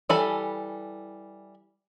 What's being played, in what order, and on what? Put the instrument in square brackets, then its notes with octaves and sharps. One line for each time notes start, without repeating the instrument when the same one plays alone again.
[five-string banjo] E3 G3 A4 G#5 B5